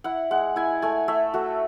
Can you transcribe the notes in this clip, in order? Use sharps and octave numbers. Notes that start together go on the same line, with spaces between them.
E4 F#5
G#3 F#5
E4 G#5
A3 G#5
A3 E5
A3 F#4